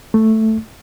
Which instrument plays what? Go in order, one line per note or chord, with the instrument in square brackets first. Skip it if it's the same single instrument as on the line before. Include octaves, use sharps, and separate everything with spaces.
[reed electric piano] A3